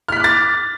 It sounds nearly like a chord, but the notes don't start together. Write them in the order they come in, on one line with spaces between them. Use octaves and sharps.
F6 B6 F#6 D6 A6